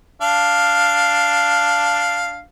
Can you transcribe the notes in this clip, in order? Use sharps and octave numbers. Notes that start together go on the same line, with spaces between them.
D4 F5